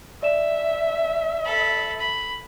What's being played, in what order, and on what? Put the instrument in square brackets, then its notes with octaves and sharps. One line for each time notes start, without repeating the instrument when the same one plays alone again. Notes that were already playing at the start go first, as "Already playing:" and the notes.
[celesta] D5 E7 [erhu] E5
[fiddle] A4 B5
B5